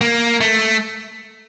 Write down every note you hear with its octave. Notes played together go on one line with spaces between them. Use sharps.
A#3
A3